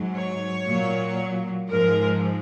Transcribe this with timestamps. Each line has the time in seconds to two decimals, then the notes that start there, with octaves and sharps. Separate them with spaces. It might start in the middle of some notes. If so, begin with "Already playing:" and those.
Already playing: G#2 F#3
0.17 C#5
0.68 A#2 F#3
1.71 G#2 F3 G#3 A#4